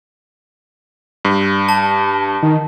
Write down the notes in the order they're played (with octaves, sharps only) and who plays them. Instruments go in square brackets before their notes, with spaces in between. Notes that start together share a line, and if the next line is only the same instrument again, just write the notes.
[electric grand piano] G2
[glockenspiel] A5
[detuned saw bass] D#3